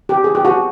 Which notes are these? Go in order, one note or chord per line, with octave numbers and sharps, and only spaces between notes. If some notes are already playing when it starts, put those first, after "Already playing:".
G4
G#4
G4
F#4